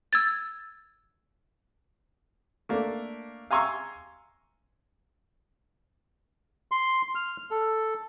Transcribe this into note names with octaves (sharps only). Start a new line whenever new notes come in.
E6 G#6 A6
A3 A#3 D4
F5 G#5 A#5 C6 C#6 E6
C6
F6
A4